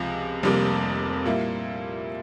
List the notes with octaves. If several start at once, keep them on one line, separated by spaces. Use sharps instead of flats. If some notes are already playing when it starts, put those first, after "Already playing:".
Already playing: C#2 C3 F3 G#3
F1 F2 C3 G3 A#3
A#2 G3 A#3 E4